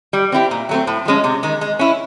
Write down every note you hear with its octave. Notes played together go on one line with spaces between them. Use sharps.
G3
C4 E4 G4
A#2
F#3 A3 C4
A2
F3 G#3 C#4
C3
D#3 G#3
G#3
C#4 E4